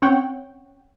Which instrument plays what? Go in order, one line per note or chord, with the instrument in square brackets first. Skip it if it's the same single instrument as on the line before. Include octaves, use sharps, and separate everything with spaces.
[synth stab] C4 C#4 C#5 F#5 G5